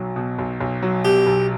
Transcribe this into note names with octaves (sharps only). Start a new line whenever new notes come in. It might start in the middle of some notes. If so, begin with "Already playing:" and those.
Already playing: B1 F#3
B2
B1
B1
F#3
B2 G4
B1